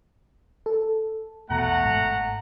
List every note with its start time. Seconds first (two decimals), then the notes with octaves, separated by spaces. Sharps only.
0.66 A4
1.49 A#1 E2 B2 A3 F#5 A#5
1.84 G1 G#2